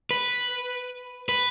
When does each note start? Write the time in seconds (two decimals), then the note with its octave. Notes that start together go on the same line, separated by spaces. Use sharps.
0.11 B4
1.29 B4